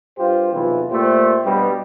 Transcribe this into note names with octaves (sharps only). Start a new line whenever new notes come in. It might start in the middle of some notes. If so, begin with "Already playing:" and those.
G2 F4 G4 C5
B1 E2 C3 E3 F4
A#2 A3 G4 C5
G2 B2 G3